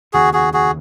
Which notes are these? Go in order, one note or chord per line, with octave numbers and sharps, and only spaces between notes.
F1 D#2 C#3 F#4 G#4
F#4 G#4
F#4 G#4